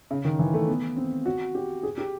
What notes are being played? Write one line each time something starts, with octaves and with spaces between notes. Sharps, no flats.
C#3
D#3
E3
A3
B3
C4
F#4
G4
G#4
G4